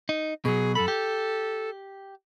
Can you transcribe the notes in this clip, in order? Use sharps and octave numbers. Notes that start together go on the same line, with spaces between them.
D#4
B2 F#3 G#4
F#2 A4 B5
G4